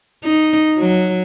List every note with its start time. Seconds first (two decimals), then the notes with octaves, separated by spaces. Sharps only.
0.25 D#4
0.78 F#3